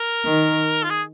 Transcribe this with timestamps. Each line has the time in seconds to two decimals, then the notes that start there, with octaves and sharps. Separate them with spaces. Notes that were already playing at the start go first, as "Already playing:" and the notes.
Already playing: A#4
0.24 D#3
0.84 F4
0.90 G#4